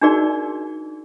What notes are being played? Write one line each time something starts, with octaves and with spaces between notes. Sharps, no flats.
D4 D#4 F#4 G#4 A#4 D5